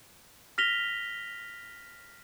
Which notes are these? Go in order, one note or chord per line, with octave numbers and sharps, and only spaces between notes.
F6 A#6 B6 F7 G7